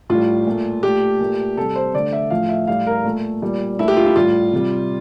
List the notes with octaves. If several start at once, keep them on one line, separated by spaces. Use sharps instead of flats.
A2 G3 F4
A#2 A3
A#2 A3 G4
A#2 A3
C3 G3 A4
C5
D3 A3 D5
E5
A2 F3 A3 F5
E5
A2 G3 F5
A#4
A#2 A3
A#2 G3
A#2 A3 E4
G4
F4
E4
A2 G3 F4
C3 G3